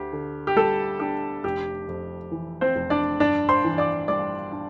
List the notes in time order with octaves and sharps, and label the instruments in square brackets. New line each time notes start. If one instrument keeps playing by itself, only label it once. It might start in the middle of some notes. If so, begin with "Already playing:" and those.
Already playing: [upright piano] D2 G4
D3
G4
G3 A4
D4 G4
F1 G4
F2
E3
C4 C5
F1
D4 D5
G2 D4 D5
C5 C6
E3
D5 D6
G3 D5 D6
D4